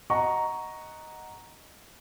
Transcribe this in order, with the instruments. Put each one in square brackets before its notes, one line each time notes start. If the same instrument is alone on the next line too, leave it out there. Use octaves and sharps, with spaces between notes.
[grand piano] D#5 F#5 A#5 C#6